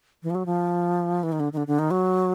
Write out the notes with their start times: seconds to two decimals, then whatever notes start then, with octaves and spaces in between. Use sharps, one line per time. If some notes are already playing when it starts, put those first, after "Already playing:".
0.23 E3
0.30 F3
0.35 F#3
0.46 F3
1.23 E3
1.32 D#3
1.40 D3
1.53 D#3
1.57 D3
1.67 D3
1.79 D#3
1.91 F#3